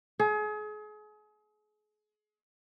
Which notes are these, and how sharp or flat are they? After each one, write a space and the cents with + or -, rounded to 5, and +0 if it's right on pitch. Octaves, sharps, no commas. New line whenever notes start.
G#4 +35